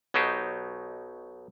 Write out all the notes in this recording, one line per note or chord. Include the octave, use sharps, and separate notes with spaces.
B1 B2 F#3 D#4 G4 C5